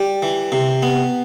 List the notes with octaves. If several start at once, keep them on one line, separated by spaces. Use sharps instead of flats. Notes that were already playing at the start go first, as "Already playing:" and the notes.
Already playing: G3
E3
C3
B3